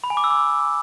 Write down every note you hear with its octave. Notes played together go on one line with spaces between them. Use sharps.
B5
G#5
D6
E6
D6